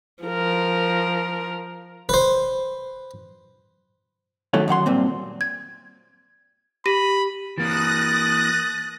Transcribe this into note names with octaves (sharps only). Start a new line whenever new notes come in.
F3 A#4
B4 C5
D#3 F#3 A3 C#4
F#2 D#3 F#5 C6
G2 A#2 C4
G#6
G4 B5 A#6 D#7
E3 A#3 D#6 F#6 A6 A#6